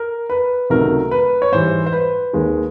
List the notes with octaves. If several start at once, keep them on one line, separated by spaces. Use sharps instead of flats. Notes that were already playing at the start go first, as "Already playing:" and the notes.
Already playing: A#4
B4
C#2 C3 D#3 F#3 A3 A#4
B4
C#5
G#2 E3 G3 C5
C5
B4
D#2 D#3 G#3